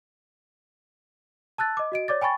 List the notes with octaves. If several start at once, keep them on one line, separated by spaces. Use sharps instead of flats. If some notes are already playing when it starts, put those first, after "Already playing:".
A5 E6 F#6 A6
D#5 D6
F#4 D#5 D7
C#5 D5 D6 A6
G5 G#5 B5 C#6 A6